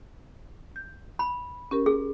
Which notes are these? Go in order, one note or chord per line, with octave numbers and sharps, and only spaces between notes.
G6
B5
C#4 G4 A#4
G#4